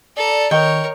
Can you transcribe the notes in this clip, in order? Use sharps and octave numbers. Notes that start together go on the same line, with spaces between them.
A4 D5 A#5
D#3 A#4 C#5 D#5 G5 C#6